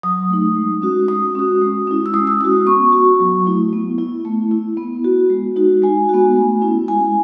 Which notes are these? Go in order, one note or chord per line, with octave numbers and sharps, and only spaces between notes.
F#3 D#6
A3 D#4
G#3
C#4 F#4
G#3 D#6
C#4 F#4
G#3
C#4 E4
E6
G#3 D#6
E6
C#4 F#4 D#6
B3 C#6
F#4
F#3
A3 E4
B3
E4
A3
E4
B3
F#4
G#3
D#4 F#4
G#3 G#5
B3 F#4
A3
C#4 E4
G#3 G#5